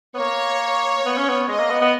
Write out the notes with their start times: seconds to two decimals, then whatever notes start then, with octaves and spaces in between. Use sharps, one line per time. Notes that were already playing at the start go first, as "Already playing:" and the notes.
0.14 B3
0.19 A#3 C#5
1.05 B3
1.17 C#4
1.29 B3
1.48 G#3 D#5
1.59 A#3
1.70 B3
1.81 B3